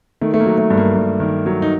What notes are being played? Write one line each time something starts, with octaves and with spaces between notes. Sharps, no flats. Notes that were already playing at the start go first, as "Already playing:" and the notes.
D#3 A3
A3
A#3
F#3
A3
G2
A#3
G2
D#3
F#3
D#4